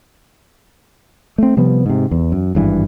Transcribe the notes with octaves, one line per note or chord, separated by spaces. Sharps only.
A3 C4
C3 F3 G3 B3
G#2 C3
E2
F#2
G#1 G2 E3